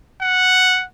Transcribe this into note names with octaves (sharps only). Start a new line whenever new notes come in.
F#5